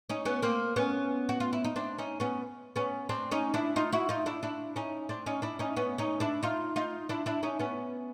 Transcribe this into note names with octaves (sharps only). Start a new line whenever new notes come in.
C#4 D#4
B3 C#4
A#3 C4
B3 C#4
F#4
F4
E4
D#4
C4 D4
C#4 D#4
B3 C#4
B3 C#4
C4 D4
C#4 D#4
D4 E4
D#4 F4
E4 F#4
D#4 F4
D4 E4
D4 E4
C#4 D#4
C4 D4
C#4 D#4
D4 E4
C#4 D#4
B3 C#4
C#4 D#4
D4 E4
D#4 F4
D#4 F4
D4 E4
D4 E4
C#4 D#4
B3 C#4